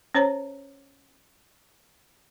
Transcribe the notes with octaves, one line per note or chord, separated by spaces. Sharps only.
C#4 C5 C#5 A#5